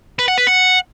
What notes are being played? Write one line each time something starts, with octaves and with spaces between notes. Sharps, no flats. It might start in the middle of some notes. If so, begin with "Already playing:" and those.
B4
F#5
B4
F#5